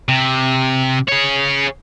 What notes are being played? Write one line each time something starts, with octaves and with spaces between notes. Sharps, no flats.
C3
G#4 C#5